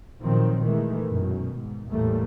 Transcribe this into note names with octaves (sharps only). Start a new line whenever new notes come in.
A#2 D#3 F3 F#3 C4
D#3 E3 G#3 A3
F#2 B2 D#3
G#2
A1 E2 A2 G3 A3 A#3